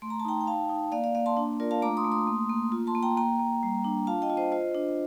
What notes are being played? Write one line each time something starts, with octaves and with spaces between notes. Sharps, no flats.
A3 C6
A#5
A5
D#4 G5 A#5
G5
D#4 F5 A5
D#4
A#3 D5 F5
D5 F5
A#3 D5 F5
A5 C6
D4
F4 A#4 D5
F5 A5
A3 A#5 D6
C6 D#6
A3
C6 D#6
A#3
A#3
F4
A5 C6
A#3
G5 A#5
A#3 G5 A#5
A#3
G3
D4
F4 F5 A5
D#5 G5
F4
C5 D#5
F4 C5 D#5
D4